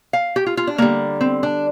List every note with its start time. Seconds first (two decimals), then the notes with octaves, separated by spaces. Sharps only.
0.13 F5
0.36 G4
0.46 F4
0.57 F4
0.67 D4
0.78 D3 G3 A#3
1.21 C4
1.43 D4